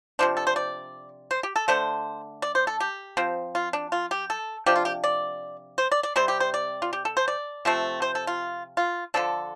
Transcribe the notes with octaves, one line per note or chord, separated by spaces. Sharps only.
C3 F3 D4 C5
A4
C5
D5
C5
G4
A4
D3 A3 D4 C5
D5
C5
A4
G4
F3 C4
F4
D4
F4
G4
A4
C3 F3 D4 G4
F4
G4
D5
C5
D5
D5
C3 G3 C4 C5
G4
C5
D5
F4
G4
A4
C5
D5
C3 F3 A3 C4
C5
A4
F4
F4
D3 F3 D4 A4